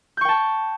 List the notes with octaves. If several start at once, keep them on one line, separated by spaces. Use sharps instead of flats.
G5 A5 C#6 G6